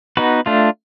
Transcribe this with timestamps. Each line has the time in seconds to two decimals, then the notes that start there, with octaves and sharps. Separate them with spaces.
0.17 B3 D#4 F#4 B4
0.46 A3 D4 F4